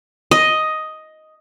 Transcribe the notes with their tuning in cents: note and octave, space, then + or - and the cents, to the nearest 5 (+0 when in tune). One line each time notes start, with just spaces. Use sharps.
D#5 +5